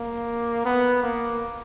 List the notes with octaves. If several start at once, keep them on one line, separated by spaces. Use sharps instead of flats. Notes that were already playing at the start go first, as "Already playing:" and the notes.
Already playing: A#3
B3
A#3